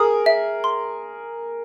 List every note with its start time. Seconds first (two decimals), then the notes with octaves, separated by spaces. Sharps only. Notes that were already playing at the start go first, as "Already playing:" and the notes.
Already playing: G#4 A#4 D#6
0.26 E5
0.64 C6